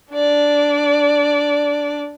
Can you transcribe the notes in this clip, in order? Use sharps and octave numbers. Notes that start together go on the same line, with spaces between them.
D4 D5